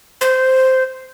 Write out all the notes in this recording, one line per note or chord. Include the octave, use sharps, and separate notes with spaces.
C5